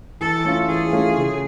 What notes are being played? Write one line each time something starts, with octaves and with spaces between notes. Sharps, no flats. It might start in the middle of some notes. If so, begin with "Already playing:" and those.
E3 A4
A3 C#4 F4
E3 G#4
A3 C#4 F4
C#3